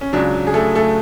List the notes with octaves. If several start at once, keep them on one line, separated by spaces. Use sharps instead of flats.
C#4
C#2 C#3 F#3 D4
G#4
A3 A4
A3 A4